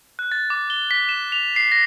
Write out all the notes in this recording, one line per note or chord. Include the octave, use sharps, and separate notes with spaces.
F#6
A6
D6
G7
B6
E7
F7
C7
A#6